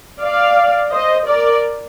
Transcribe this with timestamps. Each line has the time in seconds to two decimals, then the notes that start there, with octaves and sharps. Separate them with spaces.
0.21 D5 F5
0.92 C5 D#5
1.26 A#4 D5